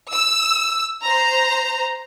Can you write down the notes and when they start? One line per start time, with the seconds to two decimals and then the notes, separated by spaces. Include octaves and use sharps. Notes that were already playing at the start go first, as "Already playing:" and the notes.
0.11 E6
1.04 C5 A#5